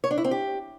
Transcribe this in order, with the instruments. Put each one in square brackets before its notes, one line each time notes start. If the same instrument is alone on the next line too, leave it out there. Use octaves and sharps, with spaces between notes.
[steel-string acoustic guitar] C#5
D4
E4
C4
G4